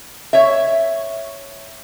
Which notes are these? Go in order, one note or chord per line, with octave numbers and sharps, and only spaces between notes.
C#5 E5